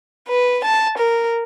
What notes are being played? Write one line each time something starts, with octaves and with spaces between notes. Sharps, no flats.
B4
A5
A#4